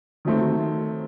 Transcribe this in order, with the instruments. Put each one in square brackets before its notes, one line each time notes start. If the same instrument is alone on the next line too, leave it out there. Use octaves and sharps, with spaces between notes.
[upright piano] D#3 F#3 A3 C4